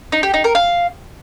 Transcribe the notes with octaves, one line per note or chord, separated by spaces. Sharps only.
D#4
G4
D#4
A#4
F5